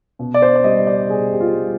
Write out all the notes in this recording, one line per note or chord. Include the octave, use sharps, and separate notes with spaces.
B2
D5
C5
D5
G3 D#5
D5
B2 G#4
G4
F4
G3